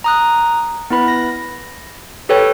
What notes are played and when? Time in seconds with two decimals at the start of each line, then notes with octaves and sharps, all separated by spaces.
0.04 A#5 D#6 F#6
0.90 B3 E4 B4 B5
1.08 A#6
2.29 G4 A4 B4 C#5 G5